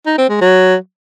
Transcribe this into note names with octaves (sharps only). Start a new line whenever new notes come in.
D#4
C4
G#3
F#3